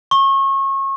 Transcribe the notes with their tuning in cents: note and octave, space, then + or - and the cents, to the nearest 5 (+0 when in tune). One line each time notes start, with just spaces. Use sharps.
C#6 -30